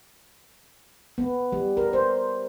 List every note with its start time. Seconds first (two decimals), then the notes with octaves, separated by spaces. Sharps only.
1.18 B3
1.52 G3
1.77 A#4
1.93 C5